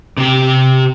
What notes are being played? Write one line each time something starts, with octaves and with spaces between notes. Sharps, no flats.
C3 G4